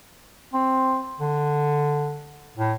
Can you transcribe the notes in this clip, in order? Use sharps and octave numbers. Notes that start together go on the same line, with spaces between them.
C4
D3
A2